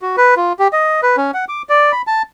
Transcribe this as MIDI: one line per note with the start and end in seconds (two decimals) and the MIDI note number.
0.02 0.16 66
0.17 0.35 71
0.37 0.53 65
0.59 0.68 67
0.73 1.01 75
1.03 1.16 71
1.17 1.31 61
1.34 1.45 78
1.49 1.62 86
1.69 1.92 74
1.92 2.02 83
2.07 2.23 81